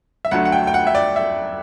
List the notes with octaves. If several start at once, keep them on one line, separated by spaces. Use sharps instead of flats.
E5
D2 D3 F#3 A3 F#5
F#5
G5
G5
F#5
E5
D5
E5